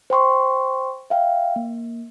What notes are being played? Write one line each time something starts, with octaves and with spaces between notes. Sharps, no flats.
C5 G5 C6 C#6
E5 F5 G5
A#3